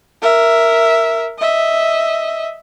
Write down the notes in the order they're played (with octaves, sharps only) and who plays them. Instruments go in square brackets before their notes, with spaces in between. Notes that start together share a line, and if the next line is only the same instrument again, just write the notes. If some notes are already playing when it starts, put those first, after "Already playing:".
[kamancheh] A#4 E5
D#5 E5